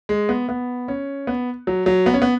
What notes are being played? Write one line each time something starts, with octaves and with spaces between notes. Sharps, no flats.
G#3
B3
B3
C#4
B3
F#3
F#3
B3
C#4
B3